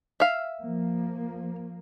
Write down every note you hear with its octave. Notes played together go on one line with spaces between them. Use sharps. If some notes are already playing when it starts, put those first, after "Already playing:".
E5 F5
F3 A#3